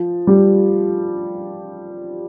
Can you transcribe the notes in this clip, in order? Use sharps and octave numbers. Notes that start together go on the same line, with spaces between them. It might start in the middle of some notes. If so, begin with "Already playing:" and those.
Already playing: F3
G3